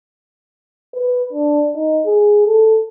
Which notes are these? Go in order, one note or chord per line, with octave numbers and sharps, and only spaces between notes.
B4
D4
D#4
G#4
A4